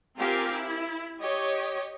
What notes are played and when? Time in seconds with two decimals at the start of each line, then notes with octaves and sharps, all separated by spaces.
0.17 C4 F4 G4 A#4 F5 G#5
0.52 E4
1.20 G4 C#5 D#5